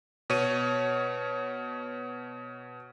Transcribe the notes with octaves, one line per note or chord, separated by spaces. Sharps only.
B2 C#5 D#7